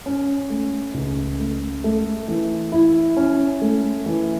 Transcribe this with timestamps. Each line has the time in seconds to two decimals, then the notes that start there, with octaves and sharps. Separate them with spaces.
0.06 C#4
0.50 A3
0.94 C#2
1.39 A3
1.84 A3
2.28 E3
2.72 E4
3.17 C#4
3.62 A3
4.06 E3